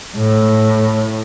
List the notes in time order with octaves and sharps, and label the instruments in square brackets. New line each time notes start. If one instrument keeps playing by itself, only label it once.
[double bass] A2